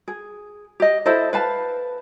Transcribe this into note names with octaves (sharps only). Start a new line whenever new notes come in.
G#4
G4 D#5
E4 A4 C5 D#5
B4 F5 A5